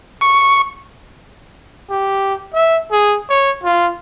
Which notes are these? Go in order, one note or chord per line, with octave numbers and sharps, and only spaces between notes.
C#6
G4
E5
G#4
C#5
F4